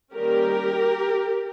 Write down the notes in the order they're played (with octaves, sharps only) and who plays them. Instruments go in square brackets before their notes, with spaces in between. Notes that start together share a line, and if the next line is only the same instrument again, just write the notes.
[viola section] D#3 G3 A#3 C#4 G4 A#4